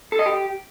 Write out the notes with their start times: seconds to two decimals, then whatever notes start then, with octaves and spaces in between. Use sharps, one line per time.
0.12 A4
0.19 D#5
0.26 G4